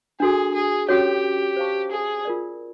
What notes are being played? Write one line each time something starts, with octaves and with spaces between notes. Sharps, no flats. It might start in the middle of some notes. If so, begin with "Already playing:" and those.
D4 F#4 G#4 A4
G#4
C#4 F#4 G4 A4 C#5
C5 F5 A5 C#6
G#4
F4 A#4 D5